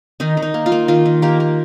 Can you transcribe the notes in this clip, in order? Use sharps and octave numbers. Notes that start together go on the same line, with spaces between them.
D#3 D#4
D#3
D#4
A#3
F4
A#3
D#3 F4
D#3
A#3 G4
A#3